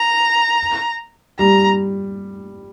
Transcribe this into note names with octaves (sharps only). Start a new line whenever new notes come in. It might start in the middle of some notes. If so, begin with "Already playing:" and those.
Already playing: A#5
G3 A#5